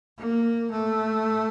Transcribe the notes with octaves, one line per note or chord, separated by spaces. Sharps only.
A#3
A3